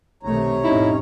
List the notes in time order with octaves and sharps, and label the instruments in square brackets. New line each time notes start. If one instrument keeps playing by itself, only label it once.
[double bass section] B1 D#3 A3 [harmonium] C3 C#5 A#5
[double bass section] F2 A2 C#4 [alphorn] D#4 [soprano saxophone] E4